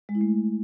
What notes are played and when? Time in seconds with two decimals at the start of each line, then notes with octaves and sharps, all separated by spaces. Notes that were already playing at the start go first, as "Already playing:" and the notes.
0.09 G#3
0.15 E4
0.21 A3